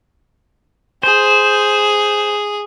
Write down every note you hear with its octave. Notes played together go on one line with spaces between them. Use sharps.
G#4 C5